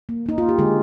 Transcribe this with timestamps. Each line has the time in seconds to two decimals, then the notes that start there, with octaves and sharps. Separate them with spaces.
0.09 A#3
0.26 A#3 D#4
0.38 A#3 F4
0.49 G4
0.58 D3 G#3 G#4